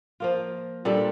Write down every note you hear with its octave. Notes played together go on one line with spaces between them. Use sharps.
F3 A#3 F4
A#2 G3 D4 A4